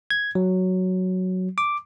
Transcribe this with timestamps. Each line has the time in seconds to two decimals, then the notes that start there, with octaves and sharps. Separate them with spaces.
0.10 G#6
0.35 F#3
1.58 D6